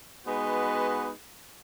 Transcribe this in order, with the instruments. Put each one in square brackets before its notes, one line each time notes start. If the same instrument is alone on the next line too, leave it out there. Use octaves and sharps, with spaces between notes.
[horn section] G#3 B3 D#4 F#4 B4